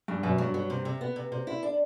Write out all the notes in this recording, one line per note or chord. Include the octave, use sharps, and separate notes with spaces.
E2 G2
F#2 B2
G2 F#3
F#3
C3
C3
B3
C3
C3
E4
D4